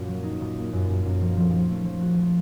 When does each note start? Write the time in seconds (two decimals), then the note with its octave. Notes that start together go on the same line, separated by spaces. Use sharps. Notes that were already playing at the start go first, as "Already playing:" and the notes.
Already playing: F#2 A#2
0.08 F#3
0.24 D#4
0.41 A#2
0.57 A#3
0.73 F#2
0.89 F#2
1.05 F#2
1.21 F3
1.37 F3
1.54 F3
1.70 A3
1.85 F3
2.01 F#4
2.18 F3